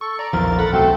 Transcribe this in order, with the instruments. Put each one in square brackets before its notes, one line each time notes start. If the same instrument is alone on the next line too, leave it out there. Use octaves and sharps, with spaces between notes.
[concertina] A4 [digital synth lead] C#6
[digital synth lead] D5 [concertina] A#5
[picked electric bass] A#1 E2 F3 [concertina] A#4 [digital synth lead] A6
[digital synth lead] A4 [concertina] F#5 B5
[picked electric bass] C#2 C3 F#3 [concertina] A3 C4